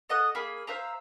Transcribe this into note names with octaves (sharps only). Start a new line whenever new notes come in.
A4 D#5 F#5 D#6
A#3 G#4 B5
C5 E5 F5 A#5